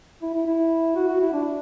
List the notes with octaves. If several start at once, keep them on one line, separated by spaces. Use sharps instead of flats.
E4
E4
E4
F#4
F#4
E4
D4